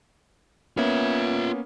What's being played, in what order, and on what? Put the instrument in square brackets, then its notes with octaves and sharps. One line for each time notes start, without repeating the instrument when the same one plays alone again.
[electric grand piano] A#3 B3 C#4 [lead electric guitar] F4 E5